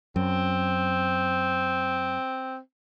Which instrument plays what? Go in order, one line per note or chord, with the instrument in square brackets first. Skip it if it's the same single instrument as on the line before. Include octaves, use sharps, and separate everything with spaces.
[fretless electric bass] F#2 [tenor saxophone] C4